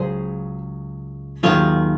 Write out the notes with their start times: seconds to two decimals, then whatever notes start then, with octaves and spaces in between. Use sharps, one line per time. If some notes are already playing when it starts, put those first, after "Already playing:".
Already playing: C#2 C#3 F#3 G#4 C5
1.43 D#2 D#3 F#3 F4 G#4